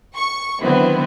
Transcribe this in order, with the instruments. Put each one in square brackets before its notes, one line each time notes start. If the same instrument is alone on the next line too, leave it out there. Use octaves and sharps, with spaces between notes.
[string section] C#6
D3 D#3 F#3 B3 C4 E4